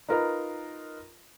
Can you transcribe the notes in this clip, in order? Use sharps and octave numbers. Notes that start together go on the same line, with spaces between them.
D#4 F4 A#4 B4 D#5 A#5